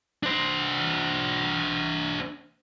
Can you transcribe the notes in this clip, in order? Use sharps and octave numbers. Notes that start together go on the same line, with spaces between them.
D4 C5